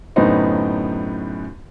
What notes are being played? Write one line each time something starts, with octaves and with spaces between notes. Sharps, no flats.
F#2 A2 D3 B3 D#4 C5